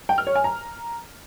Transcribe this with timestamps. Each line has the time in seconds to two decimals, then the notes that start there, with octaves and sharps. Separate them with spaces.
0.09 G5
0.18 F6
0.27 C#5
0.36 G#5
0.44 A#5